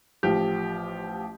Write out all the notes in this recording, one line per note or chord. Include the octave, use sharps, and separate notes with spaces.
A1 F3 G4